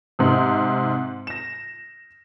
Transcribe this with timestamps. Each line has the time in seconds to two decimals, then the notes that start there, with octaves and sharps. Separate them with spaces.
0.19 G#2 C3
1.27 A#6 E7